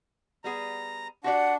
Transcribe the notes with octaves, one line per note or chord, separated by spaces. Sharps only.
G3 B3 G#4 A#5
D4 F#4 G4 D5 F#5